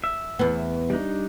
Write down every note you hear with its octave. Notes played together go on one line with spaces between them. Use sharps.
E5
E2 B3
G3 D4 D#4